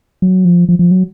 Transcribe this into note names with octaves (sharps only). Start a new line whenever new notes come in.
F#3
F3
F3
F3
F#3